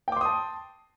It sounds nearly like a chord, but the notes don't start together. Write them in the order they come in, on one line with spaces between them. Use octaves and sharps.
G5 D6 C6 D#6 A5